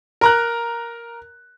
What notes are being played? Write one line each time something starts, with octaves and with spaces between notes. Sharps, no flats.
A#4 A#5 F#6